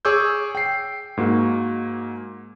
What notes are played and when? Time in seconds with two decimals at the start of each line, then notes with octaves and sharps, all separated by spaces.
0.05 G#4 C#5 C#6 D6 E6 G6
0.55 G5 C7
1.17 G#2 A#3 F#4